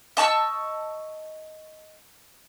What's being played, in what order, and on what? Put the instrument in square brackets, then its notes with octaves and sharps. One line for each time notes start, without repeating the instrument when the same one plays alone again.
[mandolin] D#5 A5 C#6 E6